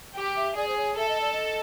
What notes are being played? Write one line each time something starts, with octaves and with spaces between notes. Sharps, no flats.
G4
E5
G#4 D5
C5
C#5
A4 E5
D#5
D5
D#5